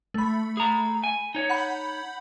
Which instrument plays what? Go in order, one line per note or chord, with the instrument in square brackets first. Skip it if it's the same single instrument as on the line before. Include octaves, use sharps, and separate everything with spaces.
[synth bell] A3 B5
[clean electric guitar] G#4 A#5
G#5
D#4 C#5
[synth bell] F#5 B5 G6